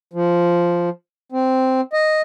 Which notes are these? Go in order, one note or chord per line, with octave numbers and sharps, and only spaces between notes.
F3
C4
D#5